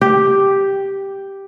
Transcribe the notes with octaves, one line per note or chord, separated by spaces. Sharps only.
G4